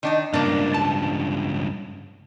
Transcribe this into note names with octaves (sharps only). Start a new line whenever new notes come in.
D#3 D4 D#4
C#2 G2 A#3 D4
A5